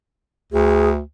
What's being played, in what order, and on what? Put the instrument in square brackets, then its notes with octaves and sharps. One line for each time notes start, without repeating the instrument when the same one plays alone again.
[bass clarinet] D2 [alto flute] G#4